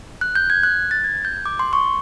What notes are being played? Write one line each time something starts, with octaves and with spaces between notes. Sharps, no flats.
F#6
G6
G#6
F#6
A6
G#6
G6
D6
C6
C#6